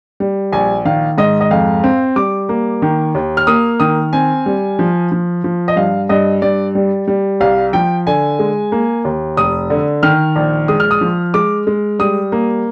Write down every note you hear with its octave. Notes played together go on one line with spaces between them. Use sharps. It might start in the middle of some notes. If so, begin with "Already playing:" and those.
G3
A#1 G#5
D#3 F5
G#2 D#5
D#5
F2 F5
C4
G3 D6
A#3
D#3
D#2
F6
A#3 D#6
D#3 D#6
C4 G#5
G3
F3
F3
F3
D#5
G2 F5
G2 D#5
G2 D5
G3
G3
C2 F5
F3 G5
D3 G#5
G#3
A#3
D#2
F1 D#6
D3
D#3 F6
A#1
G#3 D#6
F6
D#6
F3
G#3 D6
G#3
G3 D#6
A#3